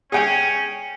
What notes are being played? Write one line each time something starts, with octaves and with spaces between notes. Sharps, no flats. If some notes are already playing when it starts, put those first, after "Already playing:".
C#4 G#4 G5 G#5